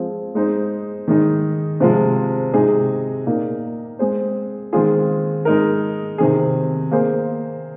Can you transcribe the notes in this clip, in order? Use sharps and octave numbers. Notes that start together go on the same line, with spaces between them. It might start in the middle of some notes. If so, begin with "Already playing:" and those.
Already playing: F3 G#3 C4 G#4
G#3 D#4 C5
D#3 G#3 D#4
C3 F3 G#3 F4
C3 G#3 D#4 G#4
A#2 A#3 D#4
G#3 C4 G#4 C5
D#3 G#3 C4 F4 G#4
G#3 D#4 A#4
C3 D#3 C4 G#4
A#3 G#4 C5